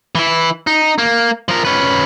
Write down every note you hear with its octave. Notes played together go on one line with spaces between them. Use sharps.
E3 E4
D#4
A#3
F3 A#4
C#4 B4